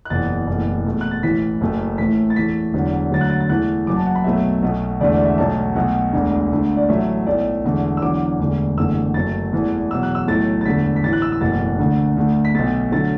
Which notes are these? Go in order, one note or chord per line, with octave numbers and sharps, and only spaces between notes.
F#6
F#1 E2 B2 A6
F#1 E2 B2 A3
E2 B2 A3
F#6
A6
A1 A2 E3 B6
F#1 F#2 F#3 A3
A1 A2 A3 B6
A6
E2 E3 A3 B6
E1 E2 D3 F#3
D2 D3 F#3 A6
F#6
A6
A6
E2 E3 A3 F#6
F#1 F#2 F#3 D6
A5
F#5
B5
B1 B2 F#3 A3 E5
B1 B2 A3
E1 E2 D3 A3 D5
D5
E5
B1 B2 F#3 A3 A5
B1 B2 A3 F#5
E1 D2 D3
D2 D3 A3
D5
A1 A2 F#3 A3 E5
B1 A2 A3 D5
E1 E2 D3 A3
E6
E1 E2 D3 F#3 D6
E1 D2 D3 A3
F#1 E2 D3 A3 E6
F#1 F#2 F#3 A3 A6
E1 E2 E3 A3
E2 B2 F#3 E6
F#6
E6
B1 A2 F#3 A3 A6
A6
E1 D2 D3 A3 B6
B6
A1 A2 E3 A6
F#6
E6
E6
F#1 E2 B2 F#3 A3 A6
D2 D3 A3
D2 D3 A3
B6
B1 B2 A3 A6
D3 F#3 A3 A6